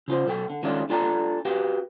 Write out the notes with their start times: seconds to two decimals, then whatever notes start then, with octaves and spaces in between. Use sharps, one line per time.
0.08 C#3 F4 C5
0.26 B1 A4 G5
0.50 D3
0.63 D#3 G#3 A3 C#4 D4 F4
0.90 D4 F4 A4 D5 G#5 A#5
1.45 F#4 G4 B4 F5 G5